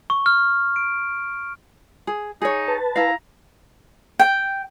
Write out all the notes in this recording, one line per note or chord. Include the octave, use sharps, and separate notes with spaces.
C#6
F6
D7
G#4
D#4 G#4 C#5
B4 A5
E4 F5 A#5
G5